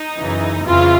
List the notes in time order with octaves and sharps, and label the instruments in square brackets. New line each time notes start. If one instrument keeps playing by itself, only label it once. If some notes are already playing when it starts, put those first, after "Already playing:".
Already playing: [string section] D#4
F#2 C#3 E3
F2 C#3 E3 F4